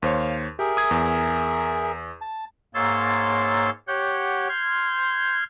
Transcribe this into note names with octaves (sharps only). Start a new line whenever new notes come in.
D#2 C5 C#5 F5
G4 G#4 A#4 E5
D#6 G#6
E2
A5
G#2 A#3 C#5 C6 E6 A6
G4 C#5 F#5 G6
C6 F6 G6 G#6